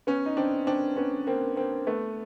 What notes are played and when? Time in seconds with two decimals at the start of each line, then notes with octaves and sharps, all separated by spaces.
0.07 B3 C#4
0.26 D#4
0.37 C4 D4
0.67 C4 D4
0.97 B3 C#4
1.27 A#3 C4
1.56 A#3 C4
1.87 A3 B3